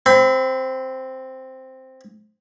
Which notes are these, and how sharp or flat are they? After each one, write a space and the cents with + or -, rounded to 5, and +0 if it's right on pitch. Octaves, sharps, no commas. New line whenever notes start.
C4 +0 B5 +40